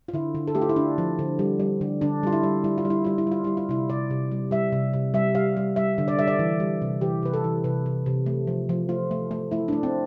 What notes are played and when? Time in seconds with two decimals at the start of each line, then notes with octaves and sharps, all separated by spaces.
0.08 F4
0.14 D3 E4
0.35 D3
0.48 A4
0.55 A3 G4
0.62 F4
0.69 E4
0.76 D3 D4
0.98 F3
1.19 D3
1.39 G3
1.60 G3
1.81 D3
2.01 D3 D4
2.23 G3 F4
2.33 E4
2.43 G3
2.64 G3 E4
2.78 F4
2.85 G3
2.90 E4
3.05 G3 F4
3.18 E4
3.27 G3 F4
3.44 G3 E4
3.57 F4
3.69 C3 E4
3.90 C3 D5
4.10 C3
4.32 G3
4.51 G3 E5
4.73 C3
4.93 C3
5.14 G3 E5
5.35 G3 F5
5.57 G3
5.76 G3 E5
5.98 D3
6.08 D5
6.19 G3 E5
6.27 D5
6.39 E3
6.60 G3
6.82 C3
7.01 E3 G4
7.23 C3 B4
7.34 A4
7.44 E3
7.64 C3 B4
7.86 C3
8.06 C3
8.26 A3
8.47 F3
8.69 F3
8.89 A3 F4
9.11 A3
9.31 A3
9.51 A3 E4
9.68 A3 D4
9.83 C4